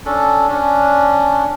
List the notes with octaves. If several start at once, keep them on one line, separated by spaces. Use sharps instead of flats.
C#4 D4 A4
C#4 D4